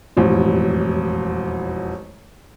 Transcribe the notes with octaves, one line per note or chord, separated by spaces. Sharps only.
E1 A1 F2